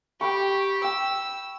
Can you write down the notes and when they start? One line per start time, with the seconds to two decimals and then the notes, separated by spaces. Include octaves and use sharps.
0.21 G4 G5 B5 C#6
0.84 G5 E6